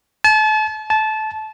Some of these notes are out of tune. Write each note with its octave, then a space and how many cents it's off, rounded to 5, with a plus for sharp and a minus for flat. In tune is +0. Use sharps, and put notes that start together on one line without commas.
A5 -35
A5 -20